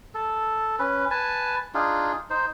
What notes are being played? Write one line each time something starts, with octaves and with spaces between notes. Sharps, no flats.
A4
C#4 B4
B4 G#5 A5
D4 D#4 F4 G#4
D#4 C5